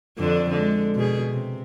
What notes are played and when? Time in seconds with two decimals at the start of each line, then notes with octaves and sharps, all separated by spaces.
0.18 F2 D3 D4
0.50 D3 G#3
0.95 B2 G#4
1.30 C3